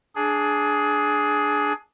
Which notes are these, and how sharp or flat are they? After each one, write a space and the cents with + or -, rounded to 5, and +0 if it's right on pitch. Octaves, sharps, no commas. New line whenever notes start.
D4 +0 G#4 +15